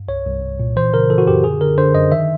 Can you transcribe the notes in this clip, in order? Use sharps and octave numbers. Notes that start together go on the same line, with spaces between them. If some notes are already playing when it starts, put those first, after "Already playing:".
Already playing: G2
C2 C#5
C2
C2
A#2
E3 C5
C#3 A#4
E3 A4
F#4
F#2 G4
D3 G#4
D3 A#4
D3 C5
F#2 D#5
D#3 E5